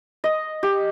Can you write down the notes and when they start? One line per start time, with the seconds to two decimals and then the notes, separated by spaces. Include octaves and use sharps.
0.24 D#5
0.63 G4